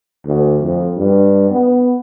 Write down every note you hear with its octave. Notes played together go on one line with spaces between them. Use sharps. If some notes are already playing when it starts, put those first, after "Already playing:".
D2
F2
G2
B3